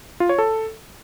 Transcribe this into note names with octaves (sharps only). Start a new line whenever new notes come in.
F4
C#5
A4